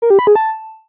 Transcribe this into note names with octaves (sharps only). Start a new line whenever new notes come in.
A#4
G4
B5
G#4
A5